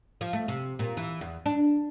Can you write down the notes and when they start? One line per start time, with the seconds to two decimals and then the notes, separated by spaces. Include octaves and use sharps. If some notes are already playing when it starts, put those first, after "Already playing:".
0.21 F3
0.33 A3
0.48 C3
0.79 A#2
0.97 E3
1.21 E2
1.46 D4